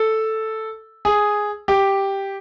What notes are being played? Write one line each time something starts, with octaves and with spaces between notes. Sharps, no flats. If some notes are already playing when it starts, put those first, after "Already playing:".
Already playing: A4
G#4
G4